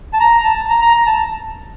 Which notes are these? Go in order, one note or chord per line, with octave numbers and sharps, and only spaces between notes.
A5
A#5
A5
A#5
A#5
A#5
A5